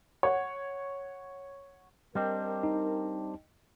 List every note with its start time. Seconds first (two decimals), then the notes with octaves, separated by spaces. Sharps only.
0.23 C#5 F#5
2.15 G3 C4 D4 A#4 D#5 G5
2.63 D#4